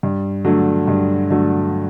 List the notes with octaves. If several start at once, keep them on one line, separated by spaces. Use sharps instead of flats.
G2
D3 F#3 A3
G2
D3 F#3 A3